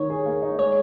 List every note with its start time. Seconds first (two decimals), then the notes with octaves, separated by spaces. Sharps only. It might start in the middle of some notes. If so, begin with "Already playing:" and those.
Already playing: D#3 D#4 C#5
0.10 G#4
0.26 A#3
0.42 D#4
0.59 G#3 C#5